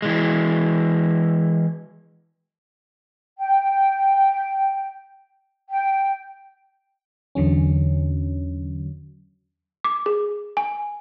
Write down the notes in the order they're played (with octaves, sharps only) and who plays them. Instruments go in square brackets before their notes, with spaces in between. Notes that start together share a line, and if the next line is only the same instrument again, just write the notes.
[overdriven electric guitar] E3 G#3
[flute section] G5
G5
[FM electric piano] E2 D3 F#3 C#4
[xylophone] D6
G#4
G#5